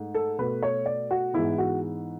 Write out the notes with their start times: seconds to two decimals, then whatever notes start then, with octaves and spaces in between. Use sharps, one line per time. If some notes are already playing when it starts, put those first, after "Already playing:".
Already playing: G#2 A3
0.15 A4
0.39 B2 A3 B4
0.63 C#5
0.86 D5
1.11 F#4
1.34 G#2 E3 G#3 B3 E4
1.58 F#4